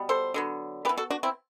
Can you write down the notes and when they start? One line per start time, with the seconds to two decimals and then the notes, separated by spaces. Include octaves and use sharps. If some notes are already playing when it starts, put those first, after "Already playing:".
Already playing: B2 G3 B3
0.09 A4 C5
0.34 D3 F#3 B3
0.85 B3 G4 B4
0.89 E3
0.97 F#4 A4
1.10 D4 F#4
1.23 C4 E4